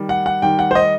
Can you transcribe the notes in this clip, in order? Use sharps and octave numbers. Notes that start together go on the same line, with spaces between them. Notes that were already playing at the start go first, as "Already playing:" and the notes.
Already playing: D#3 G3
F#5
F#5
D#3 G3 G5
F#5
C5
D#5